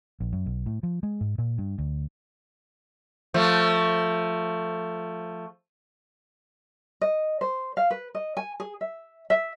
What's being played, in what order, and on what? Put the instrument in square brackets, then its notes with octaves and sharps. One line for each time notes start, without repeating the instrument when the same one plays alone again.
[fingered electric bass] A#1
F#2
B1
A2
F3
G#3
G#2
A#2
G2
D2
[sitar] F3 A3
[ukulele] D#5
C5
F5
B4
D#5
G#5
G#4
E5
E5